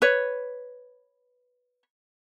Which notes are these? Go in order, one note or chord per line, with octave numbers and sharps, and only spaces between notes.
B4 C#5